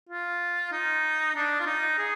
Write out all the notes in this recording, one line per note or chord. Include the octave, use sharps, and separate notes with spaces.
F4
D#4
D4
F4
D#4
G#4